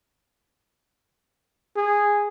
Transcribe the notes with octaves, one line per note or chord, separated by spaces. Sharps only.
G#4